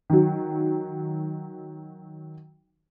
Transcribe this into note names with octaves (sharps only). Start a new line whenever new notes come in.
D#3 F#3